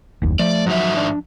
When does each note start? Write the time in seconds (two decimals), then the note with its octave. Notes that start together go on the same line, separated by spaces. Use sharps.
0.22 F#1 D#2
0.39 F3 A3 D5
0.66 G#2 D#3 F#3 E5
0.97 D4